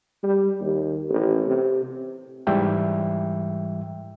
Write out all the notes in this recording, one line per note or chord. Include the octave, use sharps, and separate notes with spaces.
G3
D#2
A1
C3
G#2 E3 G3 E5 G5